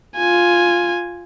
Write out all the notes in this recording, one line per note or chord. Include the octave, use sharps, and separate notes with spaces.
F4 G#5